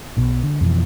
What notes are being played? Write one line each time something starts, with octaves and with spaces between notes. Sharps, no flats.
B1 B2
D3
F2 B2 E3